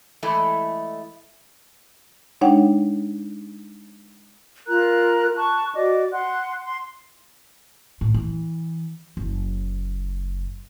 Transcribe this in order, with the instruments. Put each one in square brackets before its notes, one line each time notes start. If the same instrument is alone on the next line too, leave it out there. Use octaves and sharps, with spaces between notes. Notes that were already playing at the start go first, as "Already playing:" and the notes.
[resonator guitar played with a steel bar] E3 G#3 A3 E4 A4 D#5
[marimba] G#3 D4 D#4 C#5 F#5 G5
[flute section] F4 A#4 A#5 F#6
A5 C#6 F#6
F#4 D5 D#5 D6
F#5 C6 F#6
C6
[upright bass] A2
E3
F#1